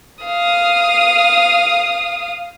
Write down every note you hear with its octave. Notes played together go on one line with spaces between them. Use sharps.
F5 D#6